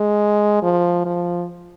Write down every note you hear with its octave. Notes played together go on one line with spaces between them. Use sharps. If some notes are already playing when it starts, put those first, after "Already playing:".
Already playing: G#3
F3
F3